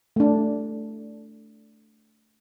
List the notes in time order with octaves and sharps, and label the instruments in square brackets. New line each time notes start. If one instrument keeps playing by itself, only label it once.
[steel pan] A3 D4